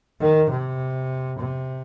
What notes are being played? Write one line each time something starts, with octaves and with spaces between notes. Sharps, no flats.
D#3
C3
C3